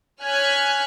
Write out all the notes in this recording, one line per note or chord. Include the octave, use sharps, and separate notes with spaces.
C#5 G#5 F6 F#6 G#6 B6